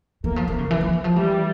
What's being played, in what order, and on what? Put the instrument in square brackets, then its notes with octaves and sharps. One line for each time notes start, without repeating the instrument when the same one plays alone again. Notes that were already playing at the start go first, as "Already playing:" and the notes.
[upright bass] E3 [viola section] A#3
[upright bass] F3
E3
C#3
E3
F3
E3
F3
[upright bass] E3 [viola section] G3